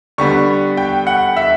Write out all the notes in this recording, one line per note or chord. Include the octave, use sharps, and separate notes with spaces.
D3 G3 B3 C#6
G5
F#5
E5